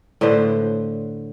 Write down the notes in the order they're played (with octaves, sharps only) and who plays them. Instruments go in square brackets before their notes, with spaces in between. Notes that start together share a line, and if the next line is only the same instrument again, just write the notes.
[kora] A2 D3 B4 C5